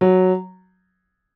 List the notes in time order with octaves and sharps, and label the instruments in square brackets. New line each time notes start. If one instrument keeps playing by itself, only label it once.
[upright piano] F#3